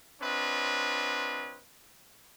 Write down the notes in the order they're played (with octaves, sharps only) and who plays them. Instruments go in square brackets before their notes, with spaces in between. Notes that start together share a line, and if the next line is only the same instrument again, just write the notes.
[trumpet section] C4 D4 F4 B4 C#5 D#5